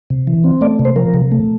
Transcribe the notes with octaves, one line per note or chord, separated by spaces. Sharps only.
C3
E3
C4
A3 D5
C3
C5
F3 A#4
C3
A3